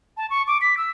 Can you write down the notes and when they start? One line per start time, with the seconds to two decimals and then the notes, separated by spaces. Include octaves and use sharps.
0.17 A5
0.30 C#6
0.47 D6
0.61 B6
0.77 E6